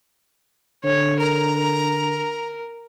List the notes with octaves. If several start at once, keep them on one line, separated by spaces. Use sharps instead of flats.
D3 C#5
A#4 A#5
A#4